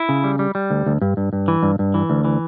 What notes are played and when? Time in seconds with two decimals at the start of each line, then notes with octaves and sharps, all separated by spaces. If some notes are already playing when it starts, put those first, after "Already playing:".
Already playing: E4
0.09 C#3
0.24 G3
0.39 G3
0.55 G3
0.70 D2
0.86 D2
1.01 G2
1.17 G2
1.33 G2
1.48 E3
1.63 G2
1.79 G2
1.94 E3
2.10 D2
2.25 E3